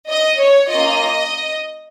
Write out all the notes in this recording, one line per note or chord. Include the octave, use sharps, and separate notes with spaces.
D#5
C#5
A#3 C#4 F4 D#5